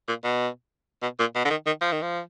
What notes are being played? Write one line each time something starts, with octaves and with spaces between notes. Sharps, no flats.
A#2
B2
B2
A#2
B2
D3
D#3
D#3
F3
D#3
F3